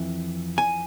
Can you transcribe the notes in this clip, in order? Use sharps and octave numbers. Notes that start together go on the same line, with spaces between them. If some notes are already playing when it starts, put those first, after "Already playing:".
Already playing: F2 E3
G#5